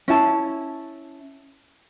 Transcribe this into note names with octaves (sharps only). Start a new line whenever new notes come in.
C#4 E4 A5